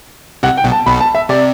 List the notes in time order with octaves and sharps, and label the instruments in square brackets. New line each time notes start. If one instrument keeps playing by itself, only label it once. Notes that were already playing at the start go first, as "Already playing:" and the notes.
[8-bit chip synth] C2 C3 [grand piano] F#5
[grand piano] G5
[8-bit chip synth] B1 B2
[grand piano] A5
[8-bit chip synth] B1 B2 [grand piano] B5
[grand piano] A5
E5
[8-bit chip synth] C3 [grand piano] D5